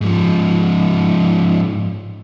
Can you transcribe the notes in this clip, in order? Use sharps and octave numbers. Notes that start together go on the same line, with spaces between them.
G#2 F3